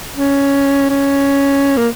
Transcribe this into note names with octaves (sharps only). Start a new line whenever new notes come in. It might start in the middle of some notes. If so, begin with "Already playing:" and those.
C#4
C#4
A#3